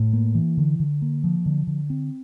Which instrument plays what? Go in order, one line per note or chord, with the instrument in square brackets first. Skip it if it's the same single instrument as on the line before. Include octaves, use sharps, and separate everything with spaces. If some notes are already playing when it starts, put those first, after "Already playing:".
Already playing: [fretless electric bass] A2
A#3
E3
D3
D3
A#3
F3
D3
D3
C4